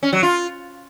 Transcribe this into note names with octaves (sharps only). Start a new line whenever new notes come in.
C#4
F#3
F4